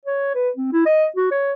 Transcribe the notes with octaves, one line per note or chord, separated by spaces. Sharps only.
C#5
B4
C4
E4
D#5
F#4
C#5